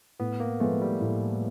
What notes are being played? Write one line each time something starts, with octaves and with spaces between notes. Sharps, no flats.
A2 B3
A#3
F3 G#3 A3 B3
G3
A2